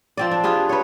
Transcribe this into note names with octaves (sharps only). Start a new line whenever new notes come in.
F3 C4 D5
D4
F4 G4 G#4 B4
B4 C#5